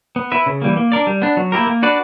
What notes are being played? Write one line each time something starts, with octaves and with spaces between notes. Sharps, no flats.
B3
E4 B4 E5
C#3
E3 G3 A#3
A#3
D4 A#4 D5
G3
B3 D4
F#3
A#3 E4 G4 A#4
A#3
D4 F#4 B4 D5